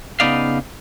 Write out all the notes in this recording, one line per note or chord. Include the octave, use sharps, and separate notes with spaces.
C#3 F3 B3 D#4 D5 F5